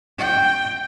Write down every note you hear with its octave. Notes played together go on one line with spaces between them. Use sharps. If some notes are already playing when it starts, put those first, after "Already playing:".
G5